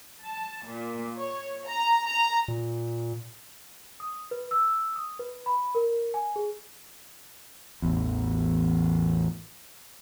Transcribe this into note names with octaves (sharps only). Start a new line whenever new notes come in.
A5
A#2
C#5
A#5
A#5
A#2
D#6
B4
E6
D#6
B4
B5
A#4
G#5
G#4
A1 E2